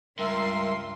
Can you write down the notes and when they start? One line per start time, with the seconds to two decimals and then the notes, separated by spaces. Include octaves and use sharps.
0.19 C#2 G2 A#4 E5 C6 E6